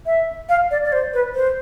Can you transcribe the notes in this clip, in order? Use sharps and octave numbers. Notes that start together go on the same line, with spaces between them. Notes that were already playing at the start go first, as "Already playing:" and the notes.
E5
F5
D5
D5
C5
B4
C5